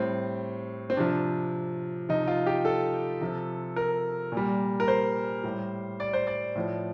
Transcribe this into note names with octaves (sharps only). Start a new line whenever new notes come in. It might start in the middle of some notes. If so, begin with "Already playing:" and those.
Already playing: A2 G3 C4
C4
C3 F3 D4
C3 F3 D#4
F4
G4
A4
C3 F3
A#4
A#2 G3
A#4
C5
A2 G3
D5
C5
D5
A2 F3